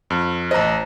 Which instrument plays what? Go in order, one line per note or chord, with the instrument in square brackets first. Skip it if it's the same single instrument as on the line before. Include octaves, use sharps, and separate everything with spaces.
[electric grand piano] F2
[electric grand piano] A1 D#5 [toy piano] C5 A#5